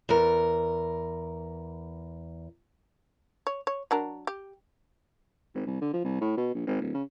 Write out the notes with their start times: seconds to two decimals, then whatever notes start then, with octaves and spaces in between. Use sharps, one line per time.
0.09 E2 A#4
3.47 C#5
3.67 C#5
3.91 F#3 D4 A#4
4.27 G4
5.55 G#1
5.67 C2
5.81 D3
5.93 F3
6.04 C2
6.21 A2
6.37 B2
6.55 A#1
6.67 G#1
6.81 D1
6.94 C#3